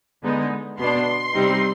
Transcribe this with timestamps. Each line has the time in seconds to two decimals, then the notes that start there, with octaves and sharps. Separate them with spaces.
0.23 D3 G#3 B3 D#4
0.79 B2 B3 D4 C6
1.34 C3 G3 C4 D#4